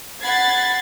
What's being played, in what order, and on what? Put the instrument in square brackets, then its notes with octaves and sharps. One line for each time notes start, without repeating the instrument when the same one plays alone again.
[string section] F#5 B5 G#6 A6 C7